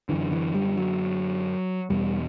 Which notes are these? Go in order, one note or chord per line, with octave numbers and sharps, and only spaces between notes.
F#2 D3 E3
E3
G3
F#3
E2 B2 G3